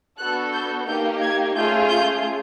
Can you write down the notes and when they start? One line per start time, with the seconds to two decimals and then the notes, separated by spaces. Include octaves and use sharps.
0.18 B3 D4 F#4 A4 F#6
0.52 G6
0.87 A#3 D#4 G4 G6
1.21 G#6
1.55 A3 C#4 F4 G#4 G6
1.89 G6